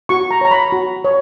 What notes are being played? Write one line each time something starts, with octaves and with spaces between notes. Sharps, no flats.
F#4 C#6
A#5
C#5 A#5
B5
F#4
C#5